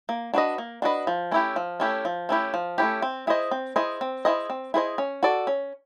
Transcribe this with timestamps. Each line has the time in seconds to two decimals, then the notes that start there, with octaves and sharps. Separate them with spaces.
0.09 A#3
0.34 D4 F#4 B4 D#5
0.58 A#3
0.82 D4 F#4 B4 D#5
1.07 F3
1.31 A3 C#4 E4 G4
1.56 F3
1.80 A3 C#4 E4 G4
2.05 F3
2.29 A3 C#4 E4 G4
2.54 F3
2.78 A3 C#4 E4 G4
3.02 C4
3.27 E4 G#4 C5 D#5
3.51 C4
3.76 E4 G#4 C5 D#5
4.01 C4
4.25 E4 G#4 C5 D#5
4.50 C4
4.74 E4 G#4 C5 D#5
4.98 C#4
5.23 F#4 A4 D5
5.47 C#4